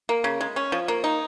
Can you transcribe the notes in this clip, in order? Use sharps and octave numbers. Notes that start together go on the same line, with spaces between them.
A#3
C#3
G#3
C#4
F3
A#3
D#4